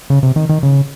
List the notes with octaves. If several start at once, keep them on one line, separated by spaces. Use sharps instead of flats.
C#3
C3
D#3
D#3
C#3